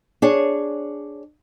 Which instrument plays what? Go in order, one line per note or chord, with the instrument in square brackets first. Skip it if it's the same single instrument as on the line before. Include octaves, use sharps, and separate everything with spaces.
[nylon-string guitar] D4 G#4 C#5